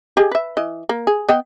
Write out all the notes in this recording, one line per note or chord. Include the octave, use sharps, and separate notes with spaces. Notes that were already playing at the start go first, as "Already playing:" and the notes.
G4 G#4 D#5
B4 E5
E3 D#5
A#3
G#4
B3 D#5 G5